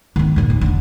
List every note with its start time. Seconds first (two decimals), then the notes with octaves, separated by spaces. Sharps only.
0.16 D#3 B3
0.36 D#2 A#2
0.50 D#2
0.61 E1 D3